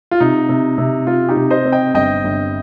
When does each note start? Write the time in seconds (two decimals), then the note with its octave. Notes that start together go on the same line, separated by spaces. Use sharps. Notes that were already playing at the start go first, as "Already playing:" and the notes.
0.11 F4
0.20 C3 D#4
0.49 C3
0.78 C3
1.07 C3 F4
1.29 D#4 G4
1.36 C3
1.51 C5 D#5
1.65 C4
1.72 D#5 G5
1.94 G1 D#5 G5
2.24 G1